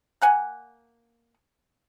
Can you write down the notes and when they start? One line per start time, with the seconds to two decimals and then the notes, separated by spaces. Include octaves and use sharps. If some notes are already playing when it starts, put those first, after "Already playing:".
0.22 A#3 F#5 G#5